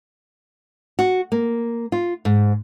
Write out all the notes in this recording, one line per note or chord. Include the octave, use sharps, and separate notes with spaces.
F#4
A#3
F4
G#2